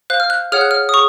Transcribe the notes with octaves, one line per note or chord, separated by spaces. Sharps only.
C5 F5 F#6
F6
F#6
G#4 C#5 F#5 F6
F#6
F6
D#6
G#4 C#6